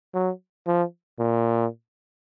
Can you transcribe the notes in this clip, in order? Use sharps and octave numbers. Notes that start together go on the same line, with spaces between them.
F#3
F3
A#2